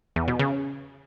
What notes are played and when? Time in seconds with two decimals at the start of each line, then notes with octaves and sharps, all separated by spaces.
0.16 E2
0.28 B2
0.39 C#3